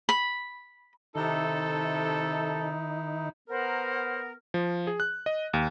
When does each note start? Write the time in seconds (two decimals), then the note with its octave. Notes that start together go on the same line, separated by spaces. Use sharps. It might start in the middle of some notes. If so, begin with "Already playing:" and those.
0.09 B5
1.15 C3 D#3 D#4 E4 A4
3.49 B3 A#4 C5 F#5
4.54 F3
4.87 G#4
5.00 F#6
5.26 D#5
5.53 D#2